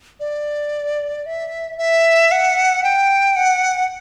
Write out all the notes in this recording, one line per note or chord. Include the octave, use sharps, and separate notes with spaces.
D5
E5
E5
F#5
G5
F#5